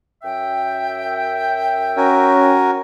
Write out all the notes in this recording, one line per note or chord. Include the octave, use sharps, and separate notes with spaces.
F#2 E5 G5
C#4 F#4 A#4 G#5